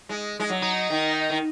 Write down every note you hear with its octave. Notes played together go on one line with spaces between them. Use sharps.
G#3
G#3
F#3
D#4
D#3
D#3